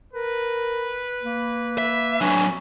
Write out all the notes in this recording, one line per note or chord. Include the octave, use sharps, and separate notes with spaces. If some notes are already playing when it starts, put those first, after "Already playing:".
A#4 B4
A#3
E5
F#3 D4 G#5